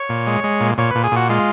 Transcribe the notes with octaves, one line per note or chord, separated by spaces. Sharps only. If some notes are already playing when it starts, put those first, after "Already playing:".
Already playing: C#5
A#2
G#3
G#3
A#2
A#2 C#5
A#2 B4
G#4
A#2 F#4
G#3 F4